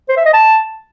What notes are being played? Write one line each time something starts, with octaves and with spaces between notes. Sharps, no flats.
C5
E5
D#5
A5